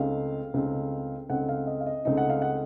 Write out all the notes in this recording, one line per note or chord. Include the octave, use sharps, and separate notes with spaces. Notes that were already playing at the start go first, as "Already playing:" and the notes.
Already playing: C#2 C#3 A3 C4 D#4 F5
C#2 C#3 A3 C4 D#4
C#2 C#3 A3 C4 D#4 F#5
F5
D#5
F5
D#5
C#2 C#3 A3 C4 D#4
F#5
F5
F#5